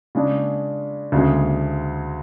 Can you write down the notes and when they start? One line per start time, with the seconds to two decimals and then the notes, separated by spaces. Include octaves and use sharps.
0.15 C#3 G#3 D4
1.12 D2 C#3 G#3